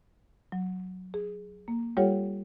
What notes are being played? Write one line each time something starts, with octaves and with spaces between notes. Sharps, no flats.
F#3
G#4
A#3
G3 F4 G4 A4 C#5 F#5